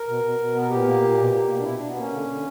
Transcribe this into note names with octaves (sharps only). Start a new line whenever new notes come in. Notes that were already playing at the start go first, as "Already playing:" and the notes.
Already playing: A#4
B2
B2
B2
B3
A#4
A#2 G4
A#3
A#2
B2
A#3
B2
D4
B2 E4
B2 D4
B3
A#3 C#4
D3
D3